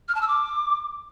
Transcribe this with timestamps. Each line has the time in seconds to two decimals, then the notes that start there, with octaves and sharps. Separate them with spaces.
0.08 F6
0.15 A5
0.21 E6
0.28 D6